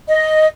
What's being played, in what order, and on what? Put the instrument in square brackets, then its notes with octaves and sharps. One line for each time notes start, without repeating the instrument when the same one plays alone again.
[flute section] D#5